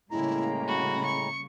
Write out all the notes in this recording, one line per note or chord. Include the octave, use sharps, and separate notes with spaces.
A2 C#3 G3 G#3 A#3 E4 A#5
F#4 B5
C#6 C#7